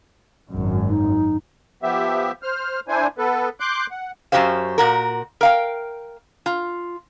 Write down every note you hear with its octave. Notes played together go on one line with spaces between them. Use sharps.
G#1 F#2
D#4
F3 B3 G4 E5
C5 F6
D4 E4 C5 G#5
B3 A4 B4
C6 D6 F#6 G6
F#5
F#2 D#3 F#4 G4 C5 F5
A#2 F#4 A#4
A#4 F5 G5
F4